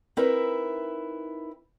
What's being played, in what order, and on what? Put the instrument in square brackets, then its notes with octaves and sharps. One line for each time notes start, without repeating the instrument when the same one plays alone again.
[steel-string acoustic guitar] C4 D#4 E4 A#4 B4 E5